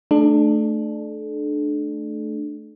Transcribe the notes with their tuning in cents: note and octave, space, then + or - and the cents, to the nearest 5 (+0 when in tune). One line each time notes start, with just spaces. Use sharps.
A3 +0 D4 +25 A4 -35